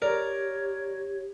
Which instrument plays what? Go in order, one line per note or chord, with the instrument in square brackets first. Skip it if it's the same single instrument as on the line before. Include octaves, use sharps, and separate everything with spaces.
[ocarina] G4 [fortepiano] A#4 [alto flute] C#5 [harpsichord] D5